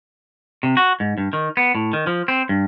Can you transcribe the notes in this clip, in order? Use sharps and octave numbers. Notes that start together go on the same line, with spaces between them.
C3
F#4
G#2
G2
D#3
B3
A2
D#3
F3
C4
G2